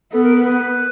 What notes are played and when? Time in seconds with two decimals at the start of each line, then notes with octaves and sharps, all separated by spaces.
0.12 B3 A4
0.23 A#4
0.44 B4